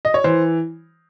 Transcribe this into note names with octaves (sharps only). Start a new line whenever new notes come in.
D#5
C#5
E3 C5